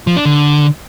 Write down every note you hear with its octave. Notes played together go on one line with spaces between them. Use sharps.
F3
D4
D3